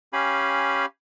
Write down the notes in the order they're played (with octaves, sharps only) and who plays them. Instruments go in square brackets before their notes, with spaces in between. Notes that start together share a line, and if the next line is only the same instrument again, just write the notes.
[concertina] C#4 G4 F5 G#5 B5